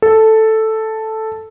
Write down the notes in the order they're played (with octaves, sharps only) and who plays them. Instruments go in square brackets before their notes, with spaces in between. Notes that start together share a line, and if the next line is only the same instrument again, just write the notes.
[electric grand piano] A4